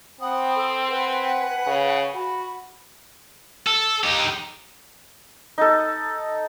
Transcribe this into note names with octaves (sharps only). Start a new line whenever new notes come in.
C4 F#5 B5 D#6
A4
B4 F#5 G#5
F#5
C#3
F#4 B5
A4
D#4 G4
D#4 A4